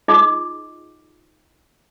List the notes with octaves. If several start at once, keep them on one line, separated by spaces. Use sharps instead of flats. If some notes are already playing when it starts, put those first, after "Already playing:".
D#4 F4 G#4 D#5 D6